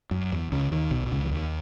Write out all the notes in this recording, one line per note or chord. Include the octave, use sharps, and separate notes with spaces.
F#2
E2
C#2 C#3
D#2 D#3
B1 B2
B2
C#2 C#3
E3
D#2 D#3